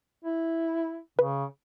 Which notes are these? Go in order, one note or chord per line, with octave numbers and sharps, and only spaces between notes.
E4
C#3 B4